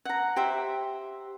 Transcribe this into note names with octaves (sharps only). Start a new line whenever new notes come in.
F#5 A#5
G4 C5 E5